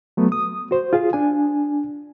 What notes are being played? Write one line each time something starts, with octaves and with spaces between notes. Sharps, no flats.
F#3 A3 B3
D#6
F#4 C5
F4 G#4 F5
D4 G#5